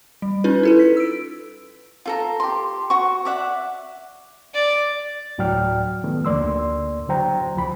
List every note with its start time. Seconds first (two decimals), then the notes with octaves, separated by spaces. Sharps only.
0.22 G3
0.44 C#4 D#4 F4 B4
0.63 E4 A4 B4
0.79 B6
0.97 E6 D7
2.06 F4 A4 A#5
2.40 G4 C6
2.90 F#4 C#6
3.25 D5 E5 F#5
4.54 D5
5.38 D2 A2 F#3 D5 G5 F6
6.04 D#3 F3 A3 B3
6.25 D2 A#3 D5 C6 E6
7.08 D3 F#3 C5 G5 A#5
7.56 C#2 F3 B5